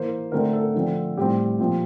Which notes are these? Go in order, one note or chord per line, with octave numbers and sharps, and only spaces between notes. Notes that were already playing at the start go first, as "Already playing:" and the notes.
Already playing: E3 A#3 C5
D3 A3 C4 A#4
A4
D3 F3 A3 C4
A2 G3 C4 G4
A#2 F3 C4